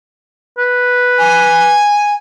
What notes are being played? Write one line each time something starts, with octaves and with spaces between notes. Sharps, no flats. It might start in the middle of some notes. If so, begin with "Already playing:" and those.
B4
G#5